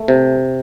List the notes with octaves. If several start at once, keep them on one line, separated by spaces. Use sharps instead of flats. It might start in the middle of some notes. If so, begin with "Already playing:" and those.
Already playing: A3
C3